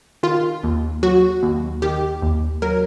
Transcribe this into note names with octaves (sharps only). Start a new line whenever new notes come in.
D#3 F4
D#2
F#3 F#4
D#2
D#3 G4
D#2
F#3 A#4